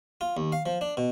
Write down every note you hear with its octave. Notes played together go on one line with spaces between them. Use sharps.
F4
D#2
F5
F3
D4
B2